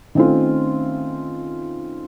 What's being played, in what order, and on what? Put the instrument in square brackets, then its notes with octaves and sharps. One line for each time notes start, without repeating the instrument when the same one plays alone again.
[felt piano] D#3 A3 C4 C#4 F4